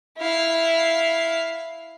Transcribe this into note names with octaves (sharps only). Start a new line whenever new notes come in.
E4 F5